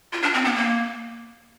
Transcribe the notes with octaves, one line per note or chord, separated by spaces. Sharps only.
F4
D4
C4
B3
A#3